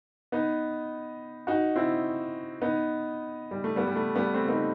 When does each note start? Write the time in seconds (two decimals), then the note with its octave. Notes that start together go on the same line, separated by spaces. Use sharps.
0.32 B3 D#4
1.47 D#4 F#4
1.76 C4 E4
2.62 B3 D#4
3.51 G3
3.64 A3
3.76 G3 B3
3.87 G3
3.96 A3
4.15 G3 B3
4.34 A3 C4
4.49 B3 D#4